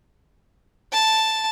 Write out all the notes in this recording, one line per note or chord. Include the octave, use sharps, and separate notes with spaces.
A5